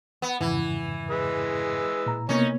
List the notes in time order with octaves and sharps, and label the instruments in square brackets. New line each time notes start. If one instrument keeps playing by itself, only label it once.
[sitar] B3
[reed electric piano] F2 G#2 C#3 [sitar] E3
[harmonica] G#3 B4 E6
[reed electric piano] A#2 A#5
[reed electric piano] C3 A#3 B3 [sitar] C#4 [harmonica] D#4 C#5